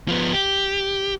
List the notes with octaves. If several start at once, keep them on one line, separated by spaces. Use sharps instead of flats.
F3 B3
G4